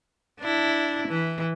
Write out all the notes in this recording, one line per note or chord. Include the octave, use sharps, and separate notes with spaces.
D4 E4
E3